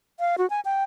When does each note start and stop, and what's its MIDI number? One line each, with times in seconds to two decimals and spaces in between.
0.20 0.36 77
0.38 0.49 66
0.50 0.60 80
0.65 0.83 79